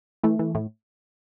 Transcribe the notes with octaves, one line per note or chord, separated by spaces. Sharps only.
E3 A3
E3
A2